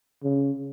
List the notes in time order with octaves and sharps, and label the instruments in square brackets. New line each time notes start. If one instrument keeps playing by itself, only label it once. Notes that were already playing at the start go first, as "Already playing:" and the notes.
[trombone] C#3